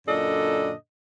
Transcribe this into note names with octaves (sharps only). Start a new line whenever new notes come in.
F#2 A#2 D3 D4 A4 D#5